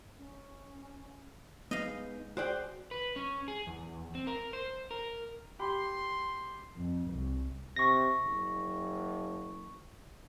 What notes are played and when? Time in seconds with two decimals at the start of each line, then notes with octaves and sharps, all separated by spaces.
0.18 C#4
1.71 G#3 B3 D#4 D#5 F5
2.37 F#4 G#4 C5 D5 G5
2.91 B4
3.16 C#4
3.48 G#4
3.67 E2
4.15 C4
4.27 A#4
4.53 C5
4.91 A#4
5.60 G4 B5 C6
6.76 F2
7.09 C2
7.76 C3 C#6 A#6
8.23 F#1